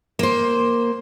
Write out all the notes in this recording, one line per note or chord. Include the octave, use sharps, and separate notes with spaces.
A#3 C5